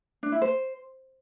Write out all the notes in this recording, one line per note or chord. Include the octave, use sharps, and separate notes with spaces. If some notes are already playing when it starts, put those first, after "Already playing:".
D4
E4
C5